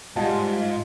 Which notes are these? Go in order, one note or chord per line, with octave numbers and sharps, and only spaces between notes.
G#2 G3 F4 D#5 F#5 A5